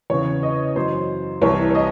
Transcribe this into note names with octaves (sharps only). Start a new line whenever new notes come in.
E2 C#3 E3 C#5
D#5
F#2 E3 C5
C2 C3 E3 C#5
C#5
D#5